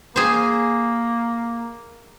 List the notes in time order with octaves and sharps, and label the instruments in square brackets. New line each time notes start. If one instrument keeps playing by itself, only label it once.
[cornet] A#3 [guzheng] G#4 C5